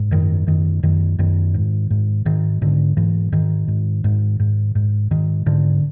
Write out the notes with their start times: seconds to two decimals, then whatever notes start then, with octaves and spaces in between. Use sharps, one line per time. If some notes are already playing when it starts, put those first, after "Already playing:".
Already playing: G#2
0.11 F#2 D#3
0.47 F#2 D#3
0.83 F#2 D#3
1.19 F#2 D#3
1.54 G#2
1.91 G#2
2.25 G#2 D#3
2.62 G#2 D3
2.97 G#2 E3
3.32 G#2 D#3
3.68 G#2
4.04 G#2
4.40 G#2
4.75 G#2
5.11 G#2 D#3
5.46 G#2 D3